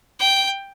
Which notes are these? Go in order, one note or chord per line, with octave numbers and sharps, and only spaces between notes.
G5